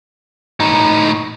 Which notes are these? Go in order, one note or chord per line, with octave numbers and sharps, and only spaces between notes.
A2 D#4